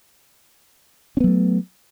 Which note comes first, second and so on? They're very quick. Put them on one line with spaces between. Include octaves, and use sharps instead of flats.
C#4 B3 F#3 A3